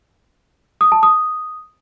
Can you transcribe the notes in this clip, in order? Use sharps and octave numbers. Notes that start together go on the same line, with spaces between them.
D#6
A5
D#6